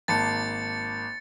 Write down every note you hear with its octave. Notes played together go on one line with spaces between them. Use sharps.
G#1 A#3 A5 A6 C#7